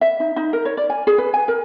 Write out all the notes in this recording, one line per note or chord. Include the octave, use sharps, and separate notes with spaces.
E5
D#4
D#4
A#4
C#5
D5
G#5
G#4
B4
G#5
A#4